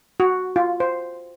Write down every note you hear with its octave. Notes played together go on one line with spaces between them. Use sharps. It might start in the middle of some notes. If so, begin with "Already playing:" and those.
F#4
F4
C5